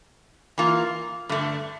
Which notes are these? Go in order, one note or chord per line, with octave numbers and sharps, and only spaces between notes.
E3 A#3 F4
G2 D3 A3 D4